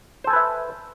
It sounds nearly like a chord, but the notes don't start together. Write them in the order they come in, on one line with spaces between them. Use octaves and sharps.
C5 A4 G#5 B4 E5